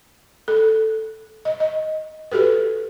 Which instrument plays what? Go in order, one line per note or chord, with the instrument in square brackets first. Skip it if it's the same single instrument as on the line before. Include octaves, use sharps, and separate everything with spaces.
[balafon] A4
D#5
D#5
F#4 G4 A4 B4